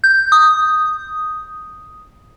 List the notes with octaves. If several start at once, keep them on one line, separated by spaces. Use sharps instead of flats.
G6
D#6